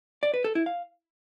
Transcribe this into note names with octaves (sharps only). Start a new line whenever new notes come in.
D5
B4
A4
E4
F5